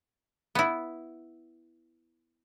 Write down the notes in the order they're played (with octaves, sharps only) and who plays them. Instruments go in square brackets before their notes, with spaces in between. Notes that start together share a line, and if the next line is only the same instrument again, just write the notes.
[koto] B3 E4